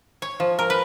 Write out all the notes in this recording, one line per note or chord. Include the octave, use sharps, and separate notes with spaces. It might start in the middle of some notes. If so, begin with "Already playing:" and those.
C#5
F3
A#4
B4